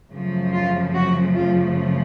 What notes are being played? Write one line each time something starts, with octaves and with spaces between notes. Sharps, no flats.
F#2 C#3 F3 A3
F4
F#4
F4